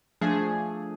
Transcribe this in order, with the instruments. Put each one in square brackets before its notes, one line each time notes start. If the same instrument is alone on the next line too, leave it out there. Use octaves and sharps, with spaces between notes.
[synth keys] F3 A3 D4 G#4